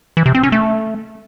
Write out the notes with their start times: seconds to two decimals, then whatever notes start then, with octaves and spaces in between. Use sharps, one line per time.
0.17 E3
0.26 C3
0.35 C4
0.43 C#4
0.52 A3